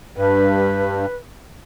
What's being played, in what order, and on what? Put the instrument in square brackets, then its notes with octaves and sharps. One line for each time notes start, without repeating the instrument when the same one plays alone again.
[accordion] G2 [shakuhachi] B4